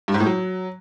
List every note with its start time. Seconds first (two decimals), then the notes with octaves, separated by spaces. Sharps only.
0.08 G2
0.14 G#2
0.20 A2
0.26 F#3